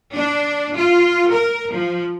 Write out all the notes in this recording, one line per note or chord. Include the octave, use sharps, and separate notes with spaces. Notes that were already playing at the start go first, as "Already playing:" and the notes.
D4
F4
A#4
F3